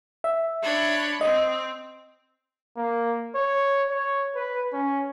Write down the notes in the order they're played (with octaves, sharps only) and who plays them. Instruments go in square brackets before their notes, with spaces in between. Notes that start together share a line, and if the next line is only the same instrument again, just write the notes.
[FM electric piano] E5
[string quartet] D4 C#5 B5
[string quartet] C4 [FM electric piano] D#5
[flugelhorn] A#3
C#5
C#5
B4
C#4